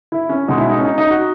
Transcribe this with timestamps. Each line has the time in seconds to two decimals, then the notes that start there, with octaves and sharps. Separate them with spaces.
0.12 E4
0.29 C#4
0.48 B2 G#3 D#4
0.58 E4
0.70 D#4
0.77 C#4
0.85 D#4
0.98 D#4
1.10 F#4